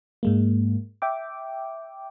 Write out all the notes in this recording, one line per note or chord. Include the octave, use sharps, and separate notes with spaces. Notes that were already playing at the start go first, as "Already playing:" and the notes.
G#2 G#3 A#3
E5 G5 D6